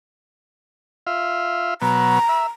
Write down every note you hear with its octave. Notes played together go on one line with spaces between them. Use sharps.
F4 E5 F5
B2 F#3 B3 A#5
E5